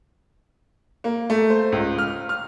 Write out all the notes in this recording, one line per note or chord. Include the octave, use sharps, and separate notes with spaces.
A#3
A3
C5
C#2
F6
F6